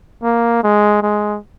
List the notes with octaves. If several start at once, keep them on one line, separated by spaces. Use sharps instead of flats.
A#3
G#3
G#3